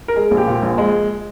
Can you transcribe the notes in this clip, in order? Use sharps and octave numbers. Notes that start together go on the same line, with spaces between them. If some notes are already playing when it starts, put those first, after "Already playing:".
A#4
G#3 G#4
A#1
G4
A#2
A#1
G#3